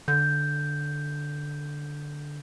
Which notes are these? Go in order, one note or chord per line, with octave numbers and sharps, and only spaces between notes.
D3 G6